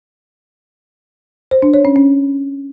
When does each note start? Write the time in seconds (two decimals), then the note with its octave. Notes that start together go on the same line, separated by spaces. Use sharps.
1.51 C5
1.62 D4
1.74 C#5
1.85 C#4
1.96 C#4